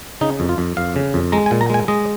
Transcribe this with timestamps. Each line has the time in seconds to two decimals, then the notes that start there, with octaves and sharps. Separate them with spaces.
0.21 C#3 D#4
0.40 F2
0.49 F4
0.58 F2
0.77 F2 F5
0.96 C#3
1.14 F2
1.32 G#3 A#5
1.46 G#5
1.51 A#2
1.61 A#5
1.70 G#3 G#5
1.88 G#3 D#5